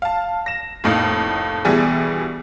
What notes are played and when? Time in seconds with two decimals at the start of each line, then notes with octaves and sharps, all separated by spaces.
0.02 F5 A5
0.46 A#6 E7
0.84 F1 F2 A2 A#3 D#4
1.65 D2 B2 E3 G3 G#4